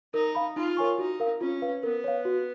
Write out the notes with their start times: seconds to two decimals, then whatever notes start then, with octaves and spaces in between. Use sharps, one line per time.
0.14 D#4 A#4
0.35 F5 B5
0.56 D#4 F4
0.77 A#4 C#5 G#5 C#6
0.98 D#4 F#4
1.20 A#4 F5
1.41 C#4 F4
1.62 B4 F5
1.83 B3 A#4
2.04 C#5 F5
2.25 F#4